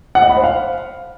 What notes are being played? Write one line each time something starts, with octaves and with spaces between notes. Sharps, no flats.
F#5
D#5
B5
C5
F5